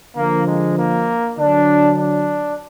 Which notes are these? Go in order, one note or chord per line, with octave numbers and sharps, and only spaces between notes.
D3 F3 A#3
G#3
A#3
D3 F#3 D4
D4